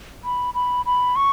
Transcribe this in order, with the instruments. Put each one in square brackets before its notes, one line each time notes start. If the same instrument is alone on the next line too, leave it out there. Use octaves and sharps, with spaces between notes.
[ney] B5
B5
B5
C#6